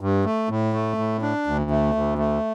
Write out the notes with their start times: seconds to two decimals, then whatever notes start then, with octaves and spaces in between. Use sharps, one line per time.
0.01 G2
0.25 A3
0.49 A2
0.73 A3
0.98 A2
1.22 D4
1.47 D2
1.70 A3
1.95 D2
2.18 A3